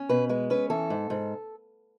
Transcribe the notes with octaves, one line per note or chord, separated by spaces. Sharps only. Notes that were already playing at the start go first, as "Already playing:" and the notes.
Already playing: C#4
B2 B4
G#3 B4
C#4 B4
E3 A4
G#2
G#2